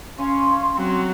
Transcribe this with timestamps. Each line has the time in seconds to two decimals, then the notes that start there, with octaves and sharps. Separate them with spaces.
0.19 C#4 F5 C6
0.77 F#3 C4